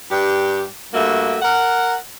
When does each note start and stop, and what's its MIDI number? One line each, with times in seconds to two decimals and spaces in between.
0.11 0.65 43
0.11 0.65 67
0.94 1.39 43
0.94 1.39 57
0.94 1.39 58
0.94 1.39 66
0.94 1.39 76
1.42 1.96 70
1.42 1.96 78